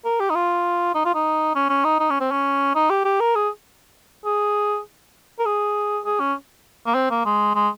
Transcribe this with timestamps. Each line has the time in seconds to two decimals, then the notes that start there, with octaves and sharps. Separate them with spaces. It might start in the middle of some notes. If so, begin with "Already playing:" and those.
0.05 A#4
0.20 G4
0.30 D#4
0.35 F4
0.94 D#4
1.05 F4
1.15 D#4
1.55 C#4
1.69 C#4
1.85 D#4
1.99 D#4
2.10 C#4
2.20 C4
2.31 C#4
2.75 D#4
2.90 G4
3.05 G4
3.20 A#4
3.35 G#4
4.25 G#4
5.39 A#4
5.46 G#4
6.05 G#4
6.20 C#4
6.86 A#3
6.95 C4
7.10 A#3
7.25 G#3
7.55 G#3